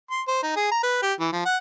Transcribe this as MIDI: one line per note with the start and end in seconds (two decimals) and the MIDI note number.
0.11 0.22 84
0.28 0.43 72
0.43 0.53 63
0.56 0.70 68
0.71 0.80 82
0.83 1.01 71
1.02 1.13 67
1.19 1.29 52
1.32 1.42 53
1.45 1.57 78